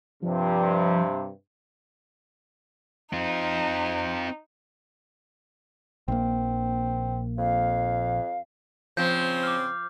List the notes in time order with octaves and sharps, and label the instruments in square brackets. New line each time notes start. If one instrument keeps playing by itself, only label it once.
[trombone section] G2 C3 [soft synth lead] F3
[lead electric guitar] C4 F4 [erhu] D#4
[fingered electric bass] A#1 A#3 [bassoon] C4
[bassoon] F2 [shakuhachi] F5
[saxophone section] C#3 C4 [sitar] F3 [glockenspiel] G6
[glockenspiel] D6 F6